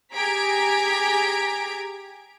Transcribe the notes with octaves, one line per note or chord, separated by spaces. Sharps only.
G4 G#4 A#5 G#6 B6 D7